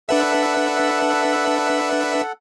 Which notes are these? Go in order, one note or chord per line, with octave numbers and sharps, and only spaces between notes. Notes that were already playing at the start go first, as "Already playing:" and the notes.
D4 A4 B4 E5 F#5